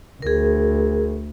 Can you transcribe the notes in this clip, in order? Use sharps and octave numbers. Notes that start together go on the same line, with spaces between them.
D2 G#4 A#4